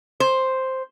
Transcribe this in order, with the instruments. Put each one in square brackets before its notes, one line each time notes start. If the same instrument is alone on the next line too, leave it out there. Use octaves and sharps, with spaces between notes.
[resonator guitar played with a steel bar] C5